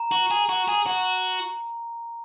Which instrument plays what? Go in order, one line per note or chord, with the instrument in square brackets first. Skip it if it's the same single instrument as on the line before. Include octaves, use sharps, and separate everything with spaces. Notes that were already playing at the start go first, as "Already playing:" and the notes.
Already playing: [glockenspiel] A#5
[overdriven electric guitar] F#4
G#4
F#4
G#4
F#4